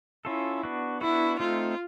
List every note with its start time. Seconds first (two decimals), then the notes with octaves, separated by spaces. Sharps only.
0.25 C#4 E4 F4 A4
0.63 B3 D4 F#4
1.01 B3 D4 E4 F#4
1.40 A3 C4 D#4 F4